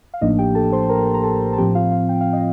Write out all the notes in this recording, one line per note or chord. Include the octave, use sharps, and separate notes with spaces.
F5
A1 A2 F3 A#3 D4 D#4 D#5
G4 G5
A4 A5
C5 C6
A#4 A#5
A#5
A4 A5
A5
A2 F3 C4 G4 G5
F4 F5
F4 F5
G5
F5
D#5